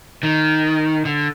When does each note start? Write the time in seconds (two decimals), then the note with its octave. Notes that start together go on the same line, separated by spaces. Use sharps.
0.23 D#3
1.05 D3